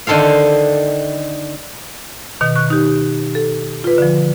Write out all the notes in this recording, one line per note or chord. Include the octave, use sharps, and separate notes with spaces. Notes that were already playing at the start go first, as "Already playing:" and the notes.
D3 D#3 A4 C5 F5
B2 D#3
C#6 F#6
D#4 G4
A4
F4 B4
D3 F3